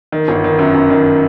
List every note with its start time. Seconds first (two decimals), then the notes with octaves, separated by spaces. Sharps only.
0.12 D#3
0.28 G1
0.44 D#3
0.59 F#2
0.74 F#2
0.90 D#3